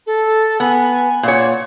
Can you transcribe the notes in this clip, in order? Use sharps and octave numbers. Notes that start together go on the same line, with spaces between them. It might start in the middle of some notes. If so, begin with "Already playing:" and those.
A4
B3 G#5
A#2 C#5 F#5